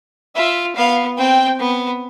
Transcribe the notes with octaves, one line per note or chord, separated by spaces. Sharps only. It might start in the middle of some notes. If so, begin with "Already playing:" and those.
F4 E5
B3 F5
C4 G5
B3